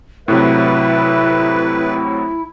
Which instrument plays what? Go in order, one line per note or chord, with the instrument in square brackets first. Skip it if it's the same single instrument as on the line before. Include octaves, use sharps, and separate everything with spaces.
[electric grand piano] A2 C3 F#3 [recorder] E4 [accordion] B4 [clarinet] E5